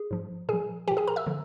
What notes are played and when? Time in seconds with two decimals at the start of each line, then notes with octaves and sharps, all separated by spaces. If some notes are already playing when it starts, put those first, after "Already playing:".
Already playing: G#4
0.11 G#2 F3
0.49 A#2 F3 G#4 G#5
0.88 F3 G4 G5
0.91 A#2
0.97 G#4 G#5
1.07 A#4 A#5
1.16 E5 E6
1.27 D3 F3